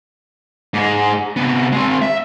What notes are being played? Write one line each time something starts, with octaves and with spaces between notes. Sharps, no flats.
G#2 G#3
C3 B3
G#3 C4
E5